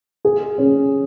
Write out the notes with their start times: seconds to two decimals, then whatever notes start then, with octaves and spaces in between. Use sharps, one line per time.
0.25 G#4
0.58 C#4